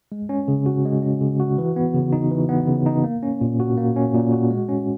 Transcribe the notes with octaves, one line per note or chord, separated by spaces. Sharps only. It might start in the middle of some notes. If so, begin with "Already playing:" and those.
G#3
C#4
C#3
F#4
G#3
C#4
C#3
F#4
E3
B3
C#3
D#4
E3
B3
C#3
D#4
A#3
C#4
A#2
F#4
A#3
C#4
A#2
F#4
G#3
C#4